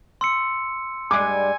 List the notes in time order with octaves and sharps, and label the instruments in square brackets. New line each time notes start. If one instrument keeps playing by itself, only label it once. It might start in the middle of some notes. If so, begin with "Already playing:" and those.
[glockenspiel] C6 E6 C#7
[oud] G2 G#3 [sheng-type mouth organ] G#5 [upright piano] D6